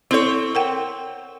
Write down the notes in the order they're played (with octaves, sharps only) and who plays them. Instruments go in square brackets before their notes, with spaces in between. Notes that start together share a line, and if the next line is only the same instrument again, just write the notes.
[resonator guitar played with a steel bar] C4 C#5 [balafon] E4 A4
[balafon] A#4 F#5 G5